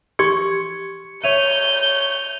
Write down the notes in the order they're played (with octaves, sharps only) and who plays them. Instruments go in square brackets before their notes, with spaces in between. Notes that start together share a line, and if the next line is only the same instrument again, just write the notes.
[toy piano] G4 C6 C#6 [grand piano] G#6 [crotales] C#7
[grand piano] C#5 E5 [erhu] G6 [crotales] D#7 F7